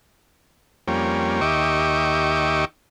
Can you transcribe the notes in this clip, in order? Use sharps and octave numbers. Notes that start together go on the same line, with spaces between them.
F2 G3 A#3 C#4
D#2 G4 D#5 E5 C#6 D6